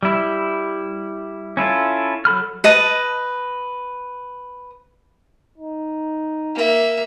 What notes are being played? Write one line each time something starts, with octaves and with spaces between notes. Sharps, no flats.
G3 E4
C#4 E4 F4 A4
F#3 A4 B5 F6
B4 D#5 A5
D#4
A#3 E5